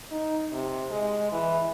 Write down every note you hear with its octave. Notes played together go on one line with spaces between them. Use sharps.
D#4
C3
G#3
E3